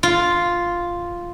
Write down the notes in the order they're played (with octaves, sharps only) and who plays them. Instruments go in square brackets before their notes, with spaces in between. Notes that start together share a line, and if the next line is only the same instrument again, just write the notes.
[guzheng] F4